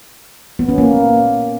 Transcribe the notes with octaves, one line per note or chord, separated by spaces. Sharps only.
B3
C#4
A#3